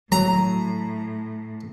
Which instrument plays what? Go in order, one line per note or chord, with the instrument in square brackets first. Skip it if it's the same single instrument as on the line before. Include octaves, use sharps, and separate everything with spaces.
[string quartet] A2 [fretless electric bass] F#3 [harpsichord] A#5